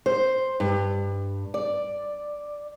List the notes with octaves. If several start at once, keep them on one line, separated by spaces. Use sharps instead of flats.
C5
G2
D5